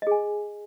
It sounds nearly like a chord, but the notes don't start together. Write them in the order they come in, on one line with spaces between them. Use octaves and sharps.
D#5 G#4 G#5